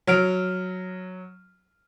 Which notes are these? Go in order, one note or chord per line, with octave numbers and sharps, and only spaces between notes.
F#3 F6 D7